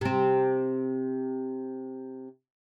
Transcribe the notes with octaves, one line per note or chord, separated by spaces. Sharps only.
C3 C4